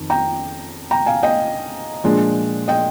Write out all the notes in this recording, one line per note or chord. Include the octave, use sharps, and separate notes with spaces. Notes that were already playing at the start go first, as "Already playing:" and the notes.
Already playing: F2 D#3
G5 A#5
G5 A#5
F5 G#5
D#5 G5
A#2 F3 G#3 D4
D#5 G5